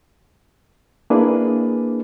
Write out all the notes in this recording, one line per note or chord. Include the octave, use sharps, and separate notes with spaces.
A#3 D4 E4 G#4 B4